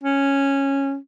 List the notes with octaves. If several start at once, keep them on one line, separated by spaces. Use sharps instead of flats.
C#4